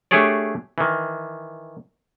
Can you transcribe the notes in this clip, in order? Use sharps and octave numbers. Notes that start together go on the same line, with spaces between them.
A3 D4 G4 G#4 C#5 D5
D#3 E3